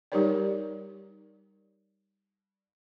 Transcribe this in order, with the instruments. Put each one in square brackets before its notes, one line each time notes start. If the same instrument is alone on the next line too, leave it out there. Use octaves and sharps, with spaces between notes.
[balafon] G3 D#4 G4 A#4 C#5 D5